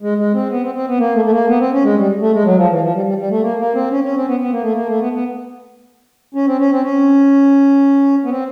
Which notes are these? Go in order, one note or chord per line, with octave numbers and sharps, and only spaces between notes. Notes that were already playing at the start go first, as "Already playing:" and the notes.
G#3
G#3
C4
B3
C4
C4
B3
A#3
A3
A3
A#3
B3
C4
C#4
G#3
G3
A3
G#3
F#3
F3
E3
F3
G3
G3
G3
A3
A#3
A#3
C4
C#4
C#4
C4
B3
B3
A#3
A3
A#3
A3
B3
B3
C#4
C4
C#4
C4
C#4
B3
C4